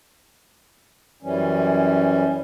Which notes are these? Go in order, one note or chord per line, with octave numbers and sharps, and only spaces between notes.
F#2 E3 G3 C#4